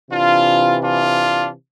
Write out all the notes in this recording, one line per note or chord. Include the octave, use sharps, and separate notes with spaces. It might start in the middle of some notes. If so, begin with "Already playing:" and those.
C3 E3 D4 F4
D4 F4